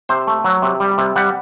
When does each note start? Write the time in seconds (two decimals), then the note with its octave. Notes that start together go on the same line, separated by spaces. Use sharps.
0.09 C3 C5
0.27 A3
0.44 F#3
0.62 C3
0.80 G3
0.98 C3
1.16 G3 F#5